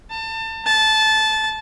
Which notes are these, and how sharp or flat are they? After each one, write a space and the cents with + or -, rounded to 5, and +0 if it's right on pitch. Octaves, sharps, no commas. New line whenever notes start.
A5 +30
A5 -15